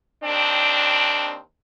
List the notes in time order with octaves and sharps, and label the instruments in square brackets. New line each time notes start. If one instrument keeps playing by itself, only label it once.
[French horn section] D#2 C4 D4